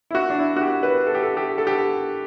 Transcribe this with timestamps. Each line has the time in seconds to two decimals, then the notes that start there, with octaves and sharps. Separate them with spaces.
0.11 E4
0.15 F#4
0.30 D4
0.38 E4
0.56 F#4
0.61 G4
0.83 B4
1.07 A4
1.15 G4
1.23 A4
1.37 G4
1.58 A4
1.67 G4